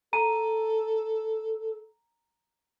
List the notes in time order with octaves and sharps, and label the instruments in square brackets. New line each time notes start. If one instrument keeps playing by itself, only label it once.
[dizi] A4 [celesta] A#5 D#7